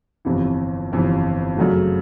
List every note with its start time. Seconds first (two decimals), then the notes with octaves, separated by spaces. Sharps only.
0.25 G1 F2 C3 E3
0.92 G1 F2 C3 E3
1.57 F#2 C#3 F#3 A3